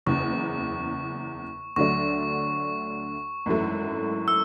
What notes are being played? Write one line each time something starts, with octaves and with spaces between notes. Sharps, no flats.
F#1 E2 C#3 C#6
D2 D3 F#3 A3 D4 C#6
G#1 F#2 E3 A3
E6